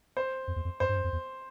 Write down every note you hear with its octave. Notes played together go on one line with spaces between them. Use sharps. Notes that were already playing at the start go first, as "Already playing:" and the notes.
C5
F2
E2
F2
F#2 C5
G2
F#2
F2
E2